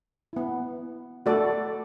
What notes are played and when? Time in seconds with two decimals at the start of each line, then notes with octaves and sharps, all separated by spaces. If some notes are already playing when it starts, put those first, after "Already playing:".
0.33 B3 E4
1.26 A3 F#4 A4 D5